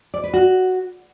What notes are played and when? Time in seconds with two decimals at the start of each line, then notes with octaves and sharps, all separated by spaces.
0.14 D5
0.24 B4
0.33 F#4